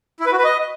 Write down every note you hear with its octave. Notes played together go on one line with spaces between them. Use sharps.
E4
B4
F#4
B4
D#5